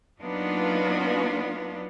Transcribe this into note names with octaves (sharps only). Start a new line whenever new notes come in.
F#3 A#3 B3 D4 D#4 F4